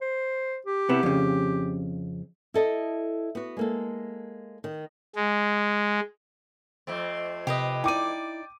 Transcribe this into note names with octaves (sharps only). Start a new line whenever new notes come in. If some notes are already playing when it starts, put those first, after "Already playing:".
C5
G4
C3 B3 E4
F2 C#3
E4 A4 D#5 E5
B3 F#4
G#3 A#3 A4
D#3
G#3
F2 A3 C4
C3 G4 B4 D#5
D#4 E4 D5 G5 D6 D#7